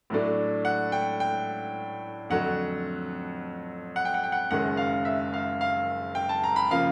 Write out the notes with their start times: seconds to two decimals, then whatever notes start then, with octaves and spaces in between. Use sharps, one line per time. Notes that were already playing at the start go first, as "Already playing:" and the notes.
0.10 A2 F#3 A3 D4
0.65 F#5
0.92 G5
1.20 G5
2.30 F2 D3 F#3 A3 F#5
3.96 F#5
4.05 G5
4.14 F#5
4.24 G5
4.32 F#5
4.51 F#1 F#2 D#3 G#3 C#4 F#5
4.77 F5
5.05 E5
5.33 F5
5.61 F5
6.15 G5
6.29 A5
6.44 A#5
6.56 B5
6.71 C#3 F3 A#3 F5